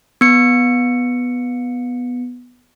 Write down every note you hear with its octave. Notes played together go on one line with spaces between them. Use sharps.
B3 C#7